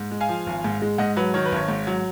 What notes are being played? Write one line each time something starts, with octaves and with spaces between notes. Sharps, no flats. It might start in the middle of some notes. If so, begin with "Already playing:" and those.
Already playing: G#2
G#3
F5 G#5
F3
G#1
G#2
G#3
G#2 D#5 F#5
F#3 B4
D#3 C#5
B4
G#1 C#5
G#2
F#3